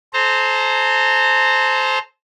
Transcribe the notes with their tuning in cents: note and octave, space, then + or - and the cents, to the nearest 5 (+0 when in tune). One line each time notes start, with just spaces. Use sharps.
A4 -40 C5 +0 A#5 -30